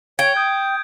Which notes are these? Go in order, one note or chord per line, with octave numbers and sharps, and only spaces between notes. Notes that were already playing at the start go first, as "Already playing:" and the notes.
C#5 G5 G#6 D7
D#6 G6